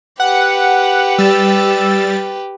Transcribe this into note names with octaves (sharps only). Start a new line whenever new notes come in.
G4 B4 F#5
G3 E6 A6